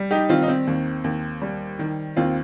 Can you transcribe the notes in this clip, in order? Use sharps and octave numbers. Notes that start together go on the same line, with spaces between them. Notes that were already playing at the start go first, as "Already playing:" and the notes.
Already playing: G3
D#4 G4
D#3 C4 F4
D#4
C4
D#2
D#2
G3
D#3
D#2 C4 F4